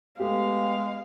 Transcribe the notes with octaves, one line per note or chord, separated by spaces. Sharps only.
G#3 A3 B3 G4 F5